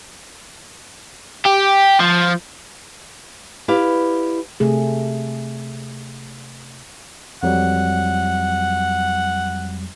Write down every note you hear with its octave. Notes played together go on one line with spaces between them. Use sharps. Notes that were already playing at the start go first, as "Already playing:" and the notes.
G4
F3
E4 G4 B4 D5 F5
C3 A3 G#4
F2 F#3 G3 F#5